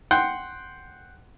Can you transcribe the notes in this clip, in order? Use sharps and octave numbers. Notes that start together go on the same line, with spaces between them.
F#5 G5 C6